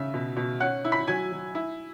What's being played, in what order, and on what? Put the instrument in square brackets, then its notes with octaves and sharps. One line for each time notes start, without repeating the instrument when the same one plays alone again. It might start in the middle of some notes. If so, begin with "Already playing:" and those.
Already playing: [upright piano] C#3 E5
B2
B2
C#4 F#5 F#6
E4
B5 B6
F#3 G#5 G#6
F#3
E4